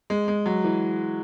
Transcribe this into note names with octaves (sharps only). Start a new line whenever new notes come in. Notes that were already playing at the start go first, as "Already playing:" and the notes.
G#3
G#3
F#3
E3